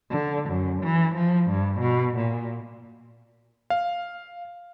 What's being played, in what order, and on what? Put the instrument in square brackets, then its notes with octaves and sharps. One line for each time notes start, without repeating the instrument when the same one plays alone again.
[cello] D3
F#2
E3
F3
G2
B2
A#2
[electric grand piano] F5